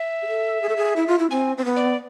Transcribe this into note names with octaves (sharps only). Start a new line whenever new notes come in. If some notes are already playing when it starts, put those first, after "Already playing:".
Already playing: E5
G#4
A4
G#4
A4
G#4
E4
F4
E4
C4 G#5
C4
B3
D5